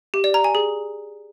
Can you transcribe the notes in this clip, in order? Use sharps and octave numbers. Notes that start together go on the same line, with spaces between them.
G4
D5
A#5
G#5
G#4